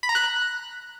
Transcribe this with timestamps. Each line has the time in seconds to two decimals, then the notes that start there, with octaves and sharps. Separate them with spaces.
0.03 B5
0.09 A#5
0.15 F#6